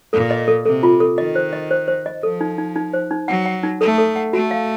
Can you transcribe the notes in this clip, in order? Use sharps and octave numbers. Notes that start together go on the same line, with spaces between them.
A#2 A4
D#5
A4
C3 A4
F4
A4
D#3 D#5
C5
D#5
C5
C5
D#5
F3 A4
D#4
D#4
D#4
C5
D#4
F#3 F#5
F#5
D#4
A3 A4
A4
F#5
A3 F#4
F5